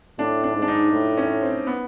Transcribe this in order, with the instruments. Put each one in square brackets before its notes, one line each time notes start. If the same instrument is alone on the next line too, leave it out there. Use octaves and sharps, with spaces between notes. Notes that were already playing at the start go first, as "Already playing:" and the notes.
[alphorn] A2 [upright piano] D4
[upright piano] D4
[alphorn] G#2
[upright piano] D4
D#4
[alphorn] A2
[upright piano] C#4
C4
B3